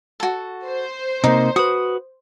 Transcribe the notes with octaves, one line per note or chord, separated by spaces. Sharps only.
F#4 A4
C5
C3 A#3 D#4
F#4 B4 D#6